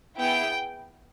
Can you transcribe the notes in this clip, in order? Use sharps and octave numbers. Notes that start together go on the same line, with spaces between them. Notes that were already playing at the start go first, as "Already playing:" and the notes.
B3 E4 G#4 G5